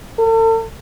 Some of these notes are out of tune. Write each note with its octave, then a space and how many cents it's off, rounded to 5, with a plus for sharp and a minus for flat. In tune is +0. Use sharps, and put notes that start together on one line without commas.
A4 +40